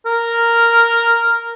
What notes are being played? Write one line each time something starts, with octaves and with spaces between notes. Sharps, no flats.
A#4